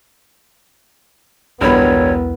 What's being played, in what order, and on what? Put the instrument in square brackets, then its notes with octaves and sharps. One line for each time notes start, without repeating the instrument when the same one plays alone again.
[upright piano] E1 G2 B5 [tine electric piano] B1 E2 E4 [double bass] B3 [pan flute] C#5